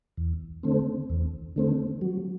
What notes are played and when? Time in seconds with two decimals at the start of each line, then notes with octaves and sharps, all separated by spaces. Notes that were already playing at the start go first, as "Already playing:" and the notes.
0.17 E2
0.63 D3 A3 C4
1.10 E2
1.56 D3 A3 C4
2.01 F#3